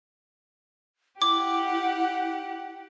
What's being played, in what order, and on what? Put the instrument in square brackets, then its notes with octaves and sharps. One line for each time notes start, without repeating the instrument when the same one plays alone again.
[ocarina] E4 [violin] G4 F#5 [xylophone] D6